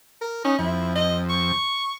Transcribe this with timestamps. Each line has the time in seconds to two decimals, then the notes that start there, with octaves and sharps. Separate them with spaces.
0.21 A#4
0.44 C#4 D#4
0.59 F2 E4
0.96 D#5
1.29 C#6